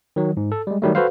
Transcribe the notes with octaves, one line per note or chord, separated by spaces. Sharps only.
D#3 F#3
G#2
A4
G3 G#3
D#3 F#3 G3 A3
F#4 A4 B4 C5 F5